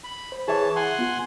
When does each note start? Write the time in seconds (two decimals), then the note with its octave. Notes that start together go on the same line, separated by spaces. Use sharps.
0.04 B5
0.32 C5
0.48 E3 G#4 C#5 E5 A5
0.76 F#5 G#5 C6
0.99 B3 F4